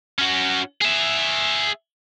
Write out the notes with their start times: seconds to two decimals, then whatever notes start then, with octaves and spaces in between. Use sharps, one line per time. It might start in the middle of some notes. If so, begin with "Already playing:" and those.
0.19 C#4 F#4
0.81 G#4 E5